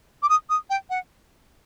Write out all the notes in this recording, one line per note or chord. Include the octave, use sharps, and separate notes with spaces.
D6
D#6
D#6
G5
F#5